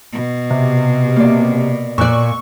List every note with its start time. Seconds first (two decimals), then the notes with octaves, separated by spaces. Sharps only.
0.13 B2
0.50 C3
1.16 A#3 D5
1.98 A#2 D5 C#6 E6 F#6